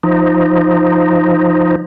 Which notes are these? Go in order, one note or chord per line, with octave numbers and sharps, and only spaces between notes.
F3 D#4